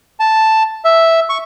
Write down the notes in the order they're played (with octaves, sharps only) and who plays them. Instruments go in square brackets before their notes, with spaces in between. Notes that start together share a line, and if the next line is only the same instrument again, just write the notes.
[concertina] A5
E5
C#6